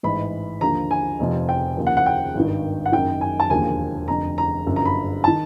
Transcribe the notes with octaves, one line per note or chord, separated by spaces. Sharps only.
A1 G#2 E3 B5
D#2 D3 F3 A#5
G#5
F1 F2 C3 F3
G5
D#2 C#3 F3
F#5
F#5
G5
G#1 G2 D#3
F#5
F#1 F#2 D#3 G5
G#5
A5
E1 D#2 D3 F3 G#5
F1 F2 D3 A#5
A#5
G1 F#2 D3 F3
A#5
B5
D#3 A5